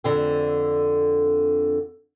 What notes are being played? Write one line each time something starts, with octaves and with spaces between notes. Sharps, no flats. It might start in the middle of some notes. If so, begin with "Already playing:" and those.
F2 D3 C4